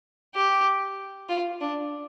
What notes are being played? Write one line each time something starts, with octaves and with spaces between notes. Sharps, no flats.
G4
F4
D4